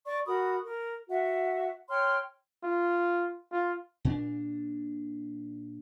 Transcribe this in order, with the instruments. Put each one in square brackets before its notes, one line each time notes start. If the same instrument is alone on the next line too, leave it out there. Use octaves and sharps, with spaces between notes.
[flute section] D5 C#6
F#4 A#4 B5 D#6
A#4
F#4 E5 F#5
C#5 G5 C6 F6
[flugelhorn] F4
F4
[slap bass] A#2 D4